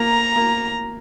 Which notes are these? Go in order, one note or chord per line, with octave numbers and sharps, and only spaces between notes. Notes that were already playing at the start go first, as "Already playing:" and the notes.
Already playing: A#3 A#5
A#3